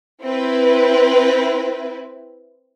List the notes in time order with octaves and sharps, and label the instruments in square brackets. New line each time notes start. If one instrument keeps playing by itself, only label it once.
[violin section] C4 E4 B4